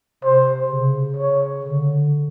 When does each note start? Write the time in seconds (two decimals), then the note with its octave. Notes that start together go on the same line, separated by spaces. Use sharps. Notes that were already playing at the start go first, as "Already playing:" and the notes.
0.24 C3 C5
0.69 C#3
1.16 C#5
1.63 D3